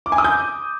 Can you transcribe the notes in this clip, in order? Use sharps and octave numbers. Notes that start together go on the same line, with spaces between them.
D6
G#5
D#6
G6